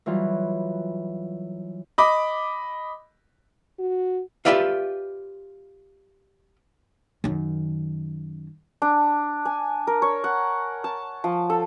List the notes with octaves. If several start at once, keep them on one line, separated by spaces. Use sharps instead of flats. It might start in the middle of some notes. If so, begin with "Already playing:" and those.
E3 F#3 G3 F4
D#5 B5 D6
F#4
F4 G4 B4 D5 E5 F5
F#2 D#3
D4
G#5
A#4
C#5
F#5
A5
F3
A4